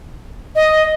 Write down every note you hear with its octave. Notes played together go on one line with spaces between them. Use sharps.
D#5